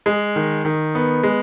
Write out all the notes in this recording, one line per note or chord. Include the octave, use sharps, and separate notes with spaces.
G#3
D#3
D#3
B3
G#3